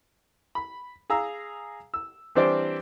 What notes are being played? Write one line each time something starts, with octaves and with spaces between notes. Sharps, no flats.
B5
G#4 F5 A#5 E6
E6
E3 G3 C4 D4 C5 D5